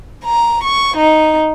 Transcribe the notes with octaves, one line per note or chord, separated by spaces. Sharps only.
A#5
C#6
D#4